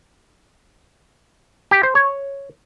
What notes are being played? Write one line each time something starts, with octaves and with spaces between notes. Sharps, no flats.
G4
C5
C#5